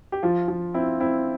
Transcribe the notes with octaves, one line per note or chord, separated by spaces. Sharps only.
G4
F3 F4
F3
C4 E4
C4 E4